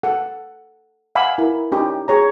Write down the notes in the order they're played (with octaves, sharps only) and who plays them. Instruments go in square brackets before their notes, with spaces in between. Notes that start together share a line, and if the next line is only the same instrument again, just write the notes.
[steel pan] A4 F#5
F5 F#5 G#5 B5 D6 E6
E4 A#4
C#4 D#4 G4
G#4 C#5 A#5